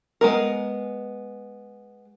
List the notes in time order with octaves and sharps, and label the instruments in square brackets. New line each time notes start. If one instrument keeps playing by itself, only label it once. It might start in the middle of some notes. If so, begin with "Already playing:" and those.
[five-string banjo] G#3 B3 A#4